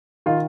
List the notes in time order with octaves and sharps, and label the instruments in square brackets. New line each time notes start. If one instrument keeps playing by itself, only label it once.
[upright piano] D#3 F4